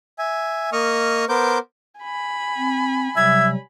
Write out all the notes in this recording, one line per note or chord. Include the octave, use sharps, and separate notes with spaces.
E5 G#5
A#3 D#5 C#6 D#6 F6
B3 A#4 C5 D6 G6
G#5 B5
C4
C3 F#3 G3 E5 G#6